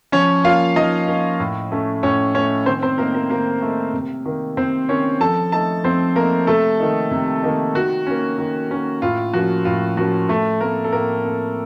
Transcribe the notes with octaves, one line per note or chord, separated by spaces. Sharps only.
F3 C#4 C#5
A#3 C#4 F4 F5
F3 D#4 D#5
A#3 C#4
A2
A3 C#4
A2 C#4 C#5
A3 C#4 C#5
D#3 C4 C5
C4 C5
A3 A#3 D#4 A#4
A#3 A#4
D#3 A#3 A#4
A3 D#4
C3
D#3 A#3
C3 C4 C5
D#3 A#3 C#4 C#5
F3 A4 A5
A3 D#4 A4 A5
F3 C4 C5
A3 A#3 D#4 A#4
C3 A3 A4
D#3 A#3 D#4
C3
D#3 A#3 D#4
D#3 F#4
A#3 C#4
D#3
A#3 C#4
A2 F4
F3 A#3 C#4 F#4
A2 F4
F3 A#3 C#4 F#4
A2 A3 A4
A3 A#3 C4 A#4
A4
A2 A#3 A#4
A3 C4